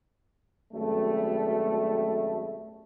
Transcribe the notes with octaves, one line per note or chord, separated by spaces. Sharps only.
G#1 F#2 B2 G3 A3